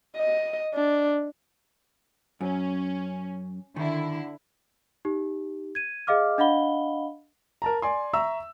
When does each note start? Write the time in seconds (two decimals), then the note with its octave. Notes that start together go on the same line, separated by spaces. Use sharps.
0.17 D#5
0.74 D4
2.41 F#2 C#4
3.76 D3 D#3 E4
5.05 D#4 G4
5.75 G#6 D#7
6.07 G#4 D#5 F5 D6 F6
6.38 D4 D#5 F5 F#5 B5 G7
7.62 A#4 A5 A#5
7.82 D5 G#5 C6
8.13 E5 A#5 C#6 E6